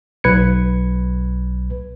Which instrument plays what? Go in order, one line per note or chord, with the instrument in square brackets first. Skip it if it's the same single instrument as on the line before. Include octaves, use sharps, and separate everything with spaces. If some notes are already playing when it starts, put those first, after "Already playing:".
[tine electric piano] B1 B4 G#6 C#7